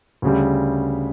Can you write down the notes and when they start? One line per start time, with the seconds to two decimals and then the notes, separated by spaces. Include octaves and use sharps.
0.22 D2 C#3 G3